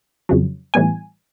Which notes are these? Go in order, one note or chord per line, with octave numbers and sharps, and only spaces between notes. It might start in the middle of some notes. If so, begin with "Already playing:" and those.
F2 C#3 F#3
A2 E3 G3 B3 G#5